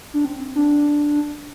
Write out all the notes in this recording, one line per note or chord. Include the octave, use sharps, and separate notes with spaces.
D4
C4
D4